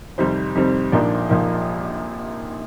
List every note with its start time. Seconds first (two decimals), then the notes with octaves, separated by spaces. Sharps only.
0.18 F2 C3 D#3 G3 C4 C5
0.55 F2 C3 D#3 G3 C4
0.92 A#1 A#2 F3 A#3 D4 D#4 D5
1.29 A#1 A#2 F3 A#3 D#4